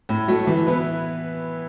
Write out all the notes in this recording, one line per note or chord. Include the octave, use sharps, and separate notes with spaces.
A2
F#3 A3
E3
B3 E4 B4